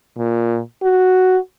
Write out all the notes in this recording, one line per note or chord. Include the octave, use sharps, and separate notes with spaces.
A#2
F#4